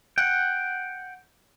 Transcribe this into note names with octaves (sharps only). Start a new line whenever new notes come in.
F#5 G5